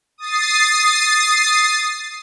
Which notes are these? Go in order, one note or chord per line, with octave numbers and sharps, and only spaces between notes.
D#6 A6 C7